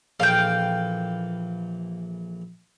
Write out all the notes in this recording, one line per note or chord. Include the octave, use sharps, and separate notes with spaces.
A#1 E3 A4 F5 G5